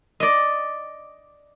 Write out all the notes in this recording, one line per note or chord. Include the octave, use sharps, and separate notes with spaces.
D5 D#5